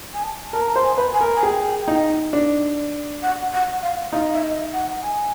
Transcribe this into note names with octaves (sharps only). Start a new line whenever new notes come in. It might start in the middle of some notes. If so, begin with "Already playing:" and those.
G#5
A5
A#4 A5
A#5
A5
C5
G#5
B4
G#5
A#4
G#5
G#4 G5
D#4
D4
F#5
F#5
F5
D#4 F5
E5
D#5
F#5
G#5